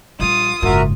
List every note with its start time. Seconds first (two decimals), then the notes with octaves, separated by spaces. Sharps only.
0.20 A#1 G3 F4 D#6
0.62 F#1 G#2 F#4 A#4 E5